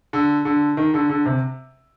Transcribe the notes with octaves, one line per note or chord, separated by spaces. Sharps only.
D3
D3
D#3
D3
D3
C3